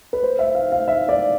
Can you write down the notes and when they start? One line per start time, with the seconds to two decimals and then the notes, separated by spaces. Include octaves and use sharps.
0.13 B4
0.23 C5
0.39 E5
0.55 F5
0.72 F5
0.88 E5
1.09 D5